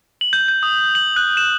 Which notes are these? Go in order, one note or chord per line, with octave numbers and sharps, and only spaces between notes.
F#7
G6
G6
D#6
F#7
F#6
E7